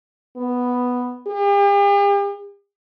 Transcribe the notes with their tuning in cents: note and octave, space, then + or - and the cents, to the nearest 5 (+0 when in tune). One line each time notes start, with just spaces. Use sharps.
B3 +0
G4 +45